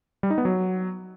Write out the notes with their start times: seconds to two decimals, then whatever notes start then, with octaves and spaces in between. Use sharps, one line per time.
0.23 G3
0.30 D#4
0.38 B3
0.45 F#3